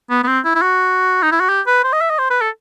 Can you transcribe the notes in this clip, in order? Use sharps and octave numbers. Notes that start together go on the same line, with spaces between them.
B3
B3
C4
E4
E4
F#4
D#4
E4
F#4
G4
B4
C5
D#5
E5
D#5
C5
B4
A4